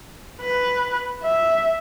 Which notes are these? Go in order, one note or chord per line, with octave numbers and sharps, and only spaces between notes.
B4
E5